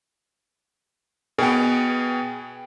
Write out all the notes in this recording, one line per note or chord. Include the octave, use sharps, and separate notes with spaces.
B2 B3 G#4 G5